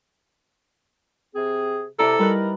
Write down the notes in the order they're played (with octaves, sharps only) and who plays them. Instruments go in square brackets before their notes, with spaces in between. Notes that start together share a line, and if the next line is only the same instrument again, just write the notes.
[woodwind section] C3 C4 G#4
[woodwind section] C3 [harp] E4 D5 A#5 [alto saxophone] A4
[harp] G3 B4 F#6 [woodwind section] D#4 E4 A#4